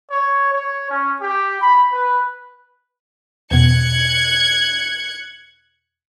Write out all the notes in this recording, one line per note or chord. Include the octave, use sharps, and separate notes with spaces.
C#5
C#5
C#4
G4
B5
B4
E2 B2 F#6 G#6 C#7